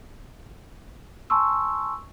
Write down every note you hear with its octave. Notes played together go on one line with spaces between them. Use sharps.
G#5 A5 C6 C#6 E6